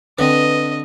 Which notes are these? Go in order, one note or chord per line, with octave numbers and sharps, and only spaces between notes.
D3 C4 B4 D#5